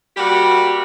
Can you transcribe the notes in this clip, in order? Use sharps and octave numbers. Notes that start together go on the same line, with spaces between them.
G3 A#3 F#4 G4